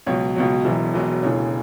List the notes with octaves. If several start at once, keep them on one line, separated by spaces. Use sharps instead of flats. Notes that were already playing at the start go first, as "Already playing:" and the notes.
C#2 B2 F#3 C#5
C#2 B2 F#3
E1 E2 B2 F#3 E5
E1 E2 B2 F#3
E1 D2 C#3 E3 C#5